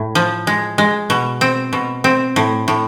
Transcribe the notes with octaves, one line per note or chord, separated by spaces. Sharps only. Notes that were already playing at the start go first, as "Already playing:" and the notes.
Already playing: A2
F3
G#3
G#3
B2
C4
B2
C4
A2
A2